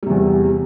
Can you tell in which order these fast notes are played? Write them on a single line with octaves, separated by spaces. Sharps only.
G3 C3 E2